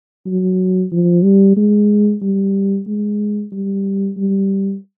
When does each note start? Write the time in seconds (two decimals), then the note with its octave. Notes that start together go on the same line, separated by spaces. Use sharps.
0.26 F#3
0.92 F3
1.24 G3
1.57 G#3
2.22 G3
2.86 G#3
3.52 G3
4.17 G3